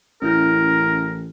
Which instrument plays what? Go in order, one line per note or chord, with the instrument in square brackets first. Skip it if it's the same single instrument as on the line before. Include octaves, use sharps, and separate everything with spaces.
[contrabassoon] A1 [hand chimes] C#4 E4 G6 [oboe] A#4